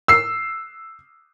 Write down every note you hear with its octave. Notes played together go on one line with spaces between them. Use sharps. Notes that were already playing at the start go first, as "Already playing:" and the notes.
E6 C7